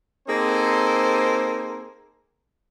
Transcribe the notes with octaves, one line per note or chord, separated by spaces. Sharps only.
A#3 C4 D#4 G#4 A4 C5